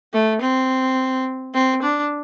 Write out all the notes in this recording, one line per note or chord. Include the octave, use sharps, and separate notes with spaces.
A3
C4
C4
D4